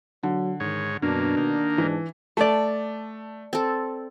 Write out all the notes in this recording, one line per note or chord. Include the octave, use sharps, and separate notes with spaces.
D3 F#3
G#2 D#3 C#5
F#2 B2 A#3 D4
D#3 A#3
G#2 E3
A3 D5 A5
C4 A4